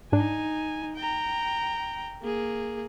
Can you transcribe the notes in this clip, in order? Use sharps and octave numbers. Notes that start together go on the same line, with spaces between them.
G#2 D4 D#4 G#5
G5 A#5
A#3 G#4